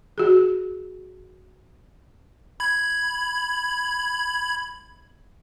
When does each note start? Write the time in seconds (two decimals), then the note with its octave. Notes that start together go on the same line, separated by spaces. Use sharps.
0.18 F#4 G#4
2.60 B5 G#6